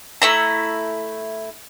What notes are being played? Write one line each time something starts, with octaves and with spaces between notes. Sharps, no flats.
A3 E4 A#5